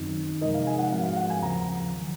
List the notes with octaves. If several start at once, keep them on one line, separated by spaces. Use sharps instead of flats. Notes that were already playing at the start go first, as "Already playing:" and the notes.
Already playing: F#2 D#3 F#3 C4 D#4
C3 F3 G#3 D#4 A#4 D#5
F5
G#5
F#5
G#2 F3 G#3 C4 F#4 F5
F5
F#5
G#5
D#2 C#3 F3 A#5
D#3 F#3